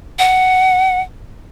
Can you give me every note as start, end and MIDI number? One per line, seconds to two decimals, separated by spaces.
0.19 1.00 78